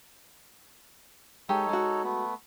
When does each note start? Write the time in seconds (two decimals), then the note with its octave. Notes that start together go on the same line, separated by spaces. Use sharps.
1.49 G#3 D#4 G4 A4 C#5
1.69 G#3 F#4
2.04 A3 B3